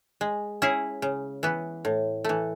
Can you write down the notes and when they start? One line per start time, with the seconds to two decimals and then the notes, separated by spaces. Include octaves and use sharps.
0.21 G#3
0.62 C#4 E4 G#4
1.02 C#3
1.43 E3 B3
1.85 A2
2.24 E3 A3